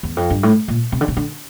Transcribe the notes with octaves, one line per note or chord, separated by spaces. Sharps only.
E2
F2
G2
A2
A#2
C3
D3
C3
D3